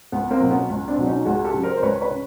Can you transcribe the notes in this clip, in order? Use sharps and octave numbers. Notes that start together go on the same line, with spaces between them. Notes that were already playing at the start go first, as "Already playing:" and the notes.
C#2 B3
A#3 C4
B2 F#3
B3 C#4
C#2
C4 D4
B2 F#3
C#4 D#4
C#2 F#4 G#4
G4 A4
C#3 F#3
A#4 C5
C5
C#2 B4 C#5
B4 C#5
C#3